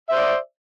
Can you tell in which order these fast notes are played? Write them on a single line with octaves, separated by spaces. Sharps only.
E5 C5 D5